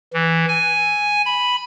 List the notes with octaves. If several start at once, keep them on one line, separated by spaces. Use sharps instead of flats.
E3
G#5
B5